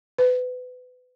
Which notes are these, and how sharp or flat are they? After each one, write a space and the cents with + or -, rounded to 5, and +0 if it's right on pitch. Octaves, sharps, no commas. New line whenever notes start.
B4 +25